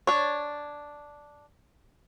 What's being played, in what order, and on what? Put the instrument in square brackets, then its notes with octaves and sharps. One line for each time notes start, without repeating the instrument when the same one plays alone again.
[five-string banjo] D4 C#5